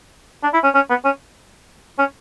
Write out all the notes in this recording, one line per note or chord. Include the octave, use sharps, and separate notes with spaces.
D4
E4
C#4
C#4
B3
C#4
C#4